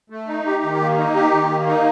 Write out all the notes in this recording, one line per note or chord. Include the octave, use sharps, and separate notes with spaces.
A3
D#4
G4
D#3
A#3
D#4
G4
D#3
A#3
D#4